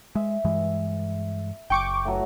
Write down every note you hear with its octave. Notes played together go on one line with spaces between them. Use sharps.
G#3 E5
G2 E3 G#3
F#1 G5 C#6 D6
A2 F#3 A#5